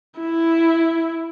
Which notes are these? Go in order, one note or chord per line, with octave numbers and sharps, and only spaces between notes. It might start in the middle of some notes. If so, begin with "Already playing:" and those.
E4